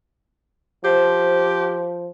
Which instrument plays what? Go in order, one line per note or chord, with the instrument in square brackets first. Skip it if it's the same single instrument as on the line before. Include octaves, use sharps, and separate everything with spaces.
[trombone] F3 [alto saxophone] G4 [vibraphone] C5